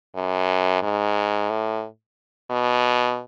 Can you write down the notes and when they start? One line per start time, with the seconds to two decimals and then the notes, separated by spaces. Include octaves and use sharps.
0.15 F#2
0.82 G#2
1.50 A2
2.50 B2